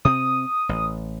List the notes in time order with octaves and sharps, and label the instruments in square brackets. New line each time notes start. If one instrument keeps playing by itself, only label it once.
[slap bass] C3 C4 [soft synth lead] D#6
[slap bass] A1